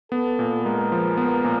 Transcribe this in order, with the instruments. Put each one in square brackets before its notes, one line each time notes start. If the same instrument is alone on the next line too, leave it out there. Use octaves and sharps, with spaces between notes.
[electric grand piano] B3 [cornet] A4
[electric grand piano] A#2
[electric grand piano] G#3 [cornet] A#4
[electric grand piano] F3
B3
A#2